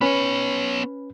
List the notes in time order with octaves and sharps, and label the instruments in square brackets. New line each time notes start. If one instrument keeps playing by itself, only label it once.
[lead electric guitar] B3 C#5 [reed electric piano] C#4 B4 B5